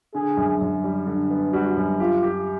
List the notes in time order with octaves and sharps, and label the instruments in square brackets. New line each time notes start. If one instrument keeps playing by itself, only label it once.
[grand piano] D3 [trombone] G#4
[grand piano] F#2
F#2
G3
D3
B3
[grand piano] G3 [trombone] F#4
[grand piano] F#2
[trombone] F4 [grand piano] G4
[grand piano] G4